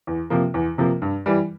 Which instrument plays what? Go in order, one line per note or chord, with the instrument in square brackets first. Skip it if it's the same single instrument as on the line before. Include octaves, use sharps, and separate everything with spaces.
[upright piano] E2
C3 F3 A#3
E2
C3 F3 A#3
G2
E3 G3